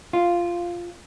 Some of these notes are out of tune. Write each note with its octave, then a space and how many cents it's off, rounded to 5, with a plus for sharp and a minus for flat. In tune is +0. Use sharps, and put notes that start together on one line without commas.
F4 -5